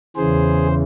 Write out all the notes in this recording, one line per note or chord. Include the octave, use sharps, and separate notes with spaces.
E2 C#3 E3 G#4 C5